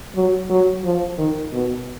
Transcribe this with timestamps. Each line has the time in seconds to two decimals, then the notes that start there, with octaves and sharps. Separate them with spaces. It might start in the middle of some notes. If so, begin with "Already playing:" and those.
0.15 F#3
0.50 F#3
0.84 F3
1.18 D#3
1.53 B2